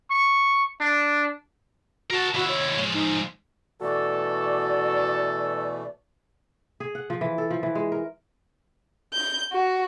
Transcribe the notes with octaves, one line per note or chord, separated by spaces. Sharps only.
C#6
D4
F#4 A#4 A5
D#2 E4 F#4
C#5
F3 G#3
D#4
B2 E3 A3 F#4 A4 D5
G#4
F#5
F3
E3
A4
F3
E3
G#3
A#4
G6
F#4